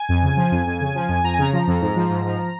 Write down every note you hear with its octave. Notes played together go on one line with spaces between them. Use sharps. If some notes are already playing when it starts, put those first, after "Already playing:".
Already playing: G#5
F2
C#3
F3
F2
F2
C#3
F3
F2
F2 A#5
G#5
C#3 A#5
F3
F2
G#2
F3
G#2
F3